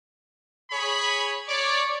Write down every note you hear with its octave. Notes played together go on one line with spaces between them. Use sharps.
G#4 C#5 B5
C#5 D5